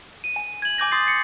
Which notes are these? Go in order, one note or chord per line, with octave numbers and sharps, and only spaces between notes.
D#7
G#5
G#6 F#7
G#5 D6 G6 A#6
C6 D#6 A6 C7
C7 C#7